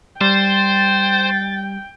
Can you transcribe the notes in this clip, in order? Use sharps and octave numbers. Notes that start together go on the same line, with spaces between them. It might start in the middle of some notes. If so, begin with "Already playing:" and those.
G3 C5 G5 A6